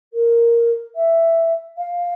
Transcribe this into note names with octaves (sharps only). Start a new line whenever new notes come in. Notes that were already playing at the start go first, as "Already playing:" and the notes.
A#4
E5
F5